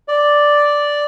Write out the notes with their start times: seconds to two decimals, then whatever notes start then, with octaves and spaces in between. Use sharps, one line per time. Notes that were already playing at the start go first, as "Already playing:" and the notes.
0.08 D5